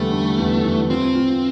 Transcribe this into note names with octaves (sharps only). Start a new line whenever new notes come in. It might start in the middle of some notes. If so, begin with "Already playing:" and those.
Already playing: E2 D3 G3 A3
D3
E2
E2
C4 F4
F4